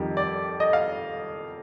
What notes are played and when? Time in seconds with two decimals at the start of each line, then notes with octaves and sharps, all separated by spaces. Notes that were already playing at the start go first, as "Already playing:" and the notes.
Already playing: F2 D#3 G3
0.17 D5
0.60 D#5
0.73 F5